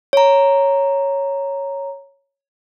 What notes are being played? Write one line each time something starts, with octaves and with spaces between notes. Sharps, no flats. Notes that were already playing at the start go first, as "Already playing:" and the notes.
C#5 A#5